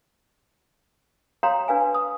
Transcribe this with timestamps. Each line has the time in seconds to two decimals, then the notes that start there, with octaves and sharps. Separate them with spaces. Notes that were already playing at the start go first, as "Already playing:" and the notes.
1.43 C#5 F5 G5 A#5 C6 D#6
1.68 D4 B4 F5 G#5
1.95 D#6